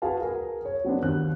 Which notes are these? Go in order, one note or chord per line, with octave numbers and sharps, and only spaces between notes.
F#4 G#4 B4 F5 A5
G#4 A#4
A#4 C#5
F#3 B3 C4 D4
D#2 F#6